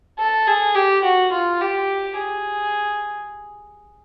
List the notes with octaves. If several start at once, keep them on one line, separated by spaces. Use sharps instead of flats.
A4
G#4
G4
F#4
F4
G4
G#4